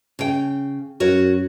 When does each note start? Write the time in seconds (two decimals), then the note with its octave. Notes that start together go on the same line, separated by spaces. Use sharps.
0.19 C#3 G5
1.00 F#2 F#4 A#4 C#5